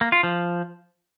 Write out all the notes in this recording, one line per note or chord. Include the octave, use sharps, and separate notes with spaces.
A#3
F4
F3